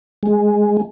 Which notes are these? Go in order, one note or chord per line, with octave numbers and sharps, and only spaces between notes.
G#3